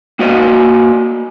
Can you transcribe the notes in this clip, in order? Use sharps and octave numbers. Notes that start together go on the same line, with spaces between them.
A#3 F#4 D5 D#5 F5